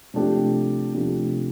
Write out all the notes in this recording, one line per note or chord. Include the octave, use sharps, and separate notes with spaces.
C3 F3 A3 D4 G4
C3 F3 A3 D4 G4